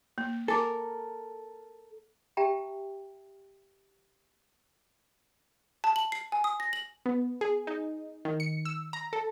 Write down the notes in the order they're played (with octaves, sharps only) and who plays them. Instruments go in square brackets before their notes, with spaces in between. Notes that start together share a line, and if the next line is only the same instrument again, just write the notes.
[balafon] A#3
[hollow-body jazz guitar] A4 A#4 [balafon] G#5 D6
[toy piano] G4 E5 G5 A5 A#5
[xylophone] A5
F#7
C7
G#5
D#6
A#6
F#7
[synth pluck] B3
G#4
D#4
D#3
C#7
E6
A#5
A4